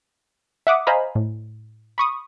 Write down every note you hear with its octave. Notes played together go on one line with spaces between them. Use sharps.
E5 F#5 D6 D#6
C5 D#5 F5 G#5 A#5 B5
A2
B5 C#6 D#6